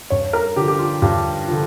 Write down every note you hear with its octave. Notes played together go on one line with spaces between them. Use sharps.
G2 C#5
A#4
D3 F3 G4
G4
F4
G2 G4
D3 F3